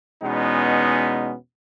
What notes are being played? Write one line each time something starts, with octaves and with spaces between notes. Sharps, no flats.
E2 B2 G#3 B3 C#4 D#4